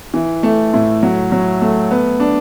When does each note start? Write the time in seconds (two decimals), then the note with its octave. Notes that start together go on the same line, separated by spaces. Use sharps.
0.14 E3
0.43 A3
0.74 A2
1.03 F#3
1.32 F#3
1.61 A3
1.91 B3
2.20 D4